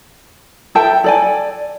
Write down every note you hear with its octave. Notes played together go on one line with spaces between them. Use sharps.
A4 E5 G5 A5
A4 D5 G#5